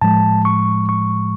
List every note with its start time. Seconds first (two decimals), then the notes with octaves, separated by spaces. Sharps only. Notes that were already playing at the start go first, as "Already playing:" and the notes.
0.01 A2 F3 G#3 A5
0.45 C#6
0.89 C#6